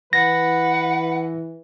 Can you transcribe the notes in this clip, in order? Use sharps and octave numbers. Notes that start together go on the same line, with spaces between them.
E3 B4 F#5 A#6